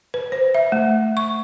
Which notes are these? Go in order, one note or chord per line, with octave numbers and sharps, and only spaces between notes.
B4
C5
E5
A3
C#6